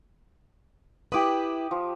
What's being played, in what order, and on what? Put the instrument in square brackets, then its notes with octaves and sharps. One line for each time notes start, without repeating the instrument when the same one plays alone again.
[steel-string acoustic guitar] E4 B4 [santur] G4 D6 D#6
[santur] F3